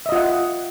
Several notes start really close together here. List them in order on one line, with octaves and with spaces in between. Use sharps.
E5 D#5 F4 F#5